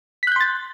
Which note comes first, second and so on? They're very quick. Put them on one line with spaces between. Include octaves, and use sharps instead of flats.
B6 F#6 G6 C6 A6